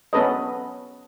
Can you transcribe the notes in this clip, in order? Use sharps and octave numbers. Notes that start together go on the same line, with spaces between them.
B3 C#4 A4 B4 D#5